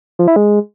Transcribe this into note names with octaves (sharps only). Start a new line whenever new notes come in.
F3
E4
G#3